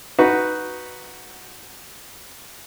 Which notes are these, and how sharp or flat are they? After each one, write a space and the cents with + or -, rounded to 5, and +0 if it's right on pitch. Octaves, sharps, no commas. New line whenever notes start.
D#4 +0 F#4 +0 B4 +0